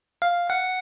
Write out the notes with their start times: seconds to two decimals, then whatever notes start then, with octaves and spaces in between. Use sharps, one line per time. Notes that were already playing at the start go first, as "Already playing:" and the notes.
0.22 F5
0.50 F#5